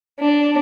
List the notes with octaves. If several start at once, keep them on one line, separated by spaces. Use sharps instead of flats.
D4